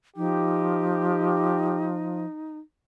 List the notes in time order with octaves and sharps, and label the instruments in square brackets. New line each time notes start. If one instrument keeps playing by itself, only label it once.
[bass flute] F3 [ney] D#4 [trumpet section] G4